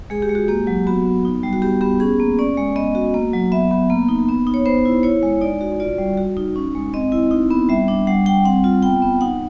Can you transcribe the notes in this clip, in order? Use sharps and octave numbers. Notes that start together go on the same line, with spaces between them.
G#3 G#4
G4
G#3
F#4
A#3 G4
F#3
B3 F#4
B3
D#4
G3
F#4
B3 G4
B3 G4
C#4 G#4
A#3
C#4 D5
G#3
B3 D#5
F#4
A#3
F#3
B3 E5
B3
A#3
D#4
B3
D#4
C#5
B3 C5
E4
E4 C#5
G#3
D#4 D5
F#4
F4 D5
G3
F#4
D#4
C#4
G#3
C4 D#5
E4
D#4
B3
G3 E5
D4
G3 F#5
G3 G5
C4 F#5
F4
B3 G5
B3
D#4 F#5